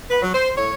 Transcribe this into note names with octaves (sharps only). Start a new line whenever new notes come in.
B4
F#3
C5
A2 C#5